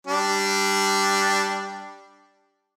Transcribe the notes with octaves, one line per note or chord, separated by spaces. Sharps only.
G3 D4